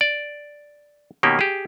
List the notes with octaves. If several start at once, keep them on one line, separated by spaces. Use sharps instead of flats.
D5
B2 D#3 A#3 C#4 G4
G4 G#4